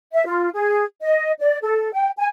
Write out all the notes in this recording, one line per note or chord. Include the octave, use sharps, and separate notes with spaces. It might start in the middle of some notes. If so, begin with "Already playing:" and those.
E5
F4
G#4
D#5
D5
A4
G5
G#5